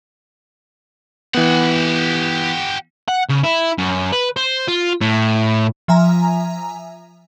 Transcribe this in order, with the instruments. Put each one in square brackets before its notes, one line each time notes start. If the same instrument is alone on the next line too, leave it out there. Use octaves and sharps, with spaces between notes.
[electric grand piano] E3 B3 [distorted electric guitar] G4 F#5
[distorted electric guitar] F#5
C#3
E4
F#2
B4
C5
F4
A2
[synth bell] F3 E5 G#5 A#5